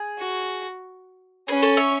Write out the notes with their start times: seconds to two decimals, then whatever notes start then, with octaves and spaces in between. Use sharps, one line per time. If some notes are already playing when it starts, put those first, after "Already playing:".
Already playing: G#4
0.19 F#4
1.48 C#4 G#4 B4
1.62 A4 C#5
1.77 C#5 E5